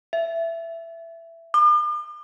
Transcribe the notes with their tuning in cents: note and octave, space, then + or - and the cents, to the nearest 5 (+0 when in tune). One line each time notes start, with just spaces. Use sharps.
E5 +10
D6 +45